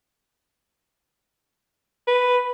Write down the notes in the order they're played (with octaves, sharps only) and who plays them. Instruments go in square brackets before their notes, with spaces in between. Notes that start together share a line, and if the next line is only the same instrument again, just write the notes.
[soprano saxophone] B4